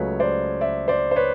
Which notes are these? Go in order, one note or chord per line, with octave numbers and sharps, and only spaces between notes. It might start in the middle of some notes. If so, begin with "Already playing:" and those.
Already playing: C#2 C#3 F#3 A3 B4 C#5
C5 D5
D5 E5
C5 D5
C5
B4 C#5